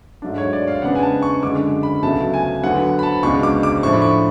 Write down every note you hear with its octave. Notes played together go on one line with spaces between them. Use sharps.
G#2 F#3 A3 D4
C#5
D5
F5
C#3 G#3 B3 D4 F#5
G#5
A5
C#6
F#2 D3 G#3 D4 D6
B5
C#2 B2 F#3 A3 A5
G#5
D2 D3 F#3 B3 F#5
B5
A5
C#2 B2 G#3 D4 C#6
D6
D6
A2 F3 A3 D4 C#6
B5
C#6